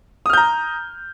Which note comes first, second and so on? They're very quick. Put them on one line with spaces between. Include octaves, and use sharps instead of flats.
D#6 F6 G6 A#5